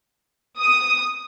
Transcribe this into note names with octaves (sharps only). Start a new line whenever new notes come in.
D#6